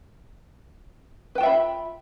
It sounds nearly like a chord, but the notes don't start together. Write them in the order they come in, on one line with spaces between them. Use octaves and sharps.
B4 G5 F4 E5 B5